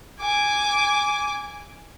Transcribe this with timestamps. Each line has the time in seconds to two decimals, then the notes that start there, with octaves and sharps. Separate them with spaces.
0.21 G#5 D6